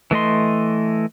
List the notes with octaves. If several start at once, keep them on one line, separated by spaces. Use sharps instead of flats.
E3 A3 D#5 C6